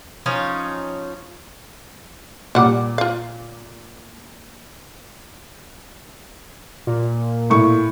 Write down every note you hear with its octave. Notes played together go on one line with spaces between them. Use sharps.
F3 C#4 D#4 C#5
A#2 G3 F#5 D6
F4 F5
A#2
A2 C#6